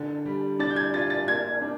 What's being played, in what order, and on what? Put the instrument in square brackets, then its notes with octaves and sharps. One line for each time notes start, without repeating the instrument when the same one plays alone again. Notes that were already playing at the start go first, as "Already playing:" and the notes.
Already playing: [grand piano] D3 [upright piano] A6
[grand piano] G3
[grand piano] D4 [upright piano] A6
[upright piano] G6
G#6
[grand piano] F4 [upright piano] A6
[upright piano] A6
[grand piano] A#3 [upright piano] G#6
[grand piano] D4